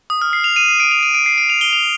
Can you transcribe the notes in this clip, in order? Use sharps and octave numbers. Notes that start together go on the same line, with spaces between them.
D#6
F6
C7
F7
D#7
C7
D7
F7
D#7
D7
C7
D7
F7
G7
F7